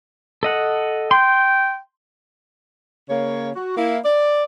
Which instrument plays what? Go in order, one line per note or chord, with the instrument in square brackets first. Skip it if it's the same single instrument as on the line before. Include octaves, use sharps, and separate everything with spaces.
[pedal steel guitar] A4 D#5 F#5
[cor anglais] G5 [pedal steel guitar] C6 G6
[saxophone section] C#3 A#3 C#5
F#4
A#3 E4
D5